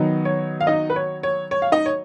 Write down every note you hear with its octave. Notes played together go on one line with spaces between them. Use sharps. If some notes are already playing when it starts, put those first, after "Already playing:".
Already playing: D#3 F#3 B3 D#4
C#5
F5
D#4 D#5
B4
C#5
C#5
C#5
F5
D#4 D#5
C#5